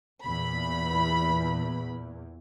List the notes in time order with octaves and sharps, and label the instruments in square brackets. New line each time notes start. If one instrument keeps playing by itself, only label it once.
[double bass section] E2 A#2 [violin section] B5